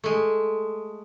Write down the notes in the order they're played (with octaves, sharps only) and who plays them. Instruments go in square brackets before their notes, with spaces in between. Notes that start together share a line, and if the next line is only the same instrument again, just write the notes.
[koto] G#3 A3